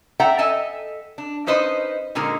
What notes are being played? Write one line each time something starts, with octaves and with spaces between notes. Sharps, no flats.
D5 E5 F#5 G5 A#5
A4 D#5 E5 G#5
D4
C#4 D#4 B4 C5 D#5
A#2 D3 G#3 D#4 A#4